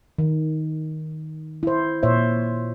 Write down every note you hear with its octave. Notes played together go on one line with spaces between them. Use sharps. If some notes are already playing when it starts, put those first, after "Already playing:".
D#3
E4 C5
A#2 C5 C#5 E5